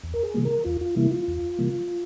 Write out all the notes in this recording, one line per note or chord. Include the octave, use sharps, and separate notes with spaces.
E2
A#4
G#4
C3 E3 G3 A#3
A#4
E2 F4
F4
C3 E3 G3 A#3 E4
F4
E2
C3 E3 G3 A#3